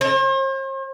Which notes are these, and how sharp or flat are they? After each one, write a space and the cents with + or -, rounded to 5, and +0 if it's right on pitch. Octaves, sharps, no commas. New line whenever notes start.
C5 +45